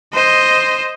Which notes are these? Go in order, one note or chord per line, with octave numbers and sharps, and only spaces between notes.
C5 D#5